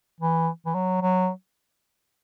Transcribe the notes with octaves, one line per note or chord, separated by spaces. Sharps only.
E3
E3
F#3
F#3